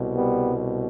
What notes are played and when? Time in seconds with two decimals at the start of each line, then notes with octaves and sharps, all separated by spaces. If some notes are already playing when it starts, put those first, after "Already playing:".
Already playing: C2 B2
0.16 G3 B3